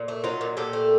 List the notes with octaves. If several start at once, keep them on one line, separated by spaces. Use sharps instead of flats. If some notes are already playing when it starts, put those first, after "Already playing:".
Already playing: A#2
A3
F#3 D#4 F4
A#2
A#2 G4 A4
A3